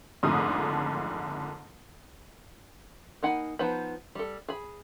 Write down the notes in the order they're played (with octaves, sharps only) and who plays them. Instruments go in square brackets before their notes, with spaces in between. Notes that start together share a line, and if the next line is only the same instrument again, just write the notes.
[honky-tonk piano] F#1 F2 G#2 D3 A3 D#6
[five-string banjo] A#3 D#4 F#5 G#5 B5
F3 B3 D#4 C5 B5
G3 A4
G#4 B5